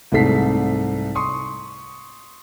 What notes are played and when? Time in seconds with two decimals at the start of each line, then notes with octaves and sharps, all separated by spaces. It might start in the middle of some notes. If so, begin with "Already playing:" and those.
0.12 C2 G#2 A3 A4 B6 C7
1.15 C6 C#6 D#6